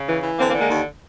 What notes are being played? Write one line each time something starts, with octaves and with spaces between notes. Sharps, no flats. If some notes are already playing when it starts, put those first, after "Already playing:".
Already playing: C#3
E3
E3
D3 A#3 C4
A#3 C4
D3
G#3 A#3
D#2